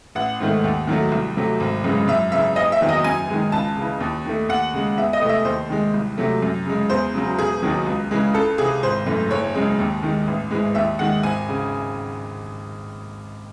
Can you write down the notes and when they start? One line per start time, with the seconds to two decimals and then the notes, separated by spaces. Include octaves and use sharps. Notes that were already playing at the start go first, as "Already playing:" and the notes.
0.15 A1 F#5
0.40 G#2 D#3 A3
0.64 D#2
0.87 D#3 F#3 A3
1.12 C2
1.36 C3 F#3 A3
1.60 G#1
1.84 F#2 C#3 E3 G#3
2.08 F#2 E5
2.32 C#3 E3 E5
2.56 F#1 D#5
2.72 E5
2.80 E2 D#3 F#3
2.89 D#5
3.04 F#2 G#5
3.29 D#3 G#3
3.52 C#2 A5
3.77 C#3 E3
4.00 D#2
4.26 D#3 A3
4.49 D#2 F#5
4.74 C#3 G#3
4.97 E2 E5
5.13 D#5
5.21 C3 E3 A3
5.29 E5
5.45 D#2 C5
5.70 D#3 G#3
5.94 C2
6.18 C3 F#3 A3
6.42 F#2
6.66 C#3 G#3
6.90 E2 C5
7.14 C#3 F#3
7.38 E1 G#4
7.62 D#2 D#3 F#3
7.86 C#2
8.11 C#3 E3 G#3
8.34 C#2 A4
8.58 C3 E3 G#4
8.83 G#1 C5
9.06 F#2 E3 A3
9.31 F#1 C#5
9.55 F#2 C#3 G#3
9.79 D#2
10.03 D#3 G#3
10.27 A1
10.51 G#2 E3 G#3
10.75 D#2 E5
10.99 D#3 G#3 F#5
11.23 G#1 G#5
11.49 C#3